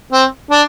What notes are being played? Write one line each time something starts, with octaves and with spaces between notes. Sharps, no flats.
C4
D4